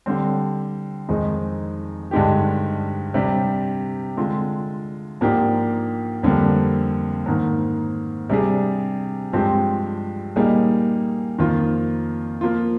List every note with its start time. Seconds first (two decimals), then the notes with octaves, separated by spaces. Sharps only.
0.06 D3 G3 C4
1.09 F2 D#3 G#3 D#4 G#4
2.11 G2 D3 G#3 D#4 G4
3.14 C3 G3 D4 G4
4.17 D3 G#3 C4 F4
5.21 G#2 F3 A#3 D4 G4
6.23 F2 D3 G3 A#3
7.26 G#2 D#3 A#3
8.29 C3 G3 D4 G#4
9.33 G2 F3 G#3 C4 G4
10.36 A#2 G3 A#3 D#4 G#4
11.38 F2 D#3 A#3 F4
12.41 F3 A#3 F4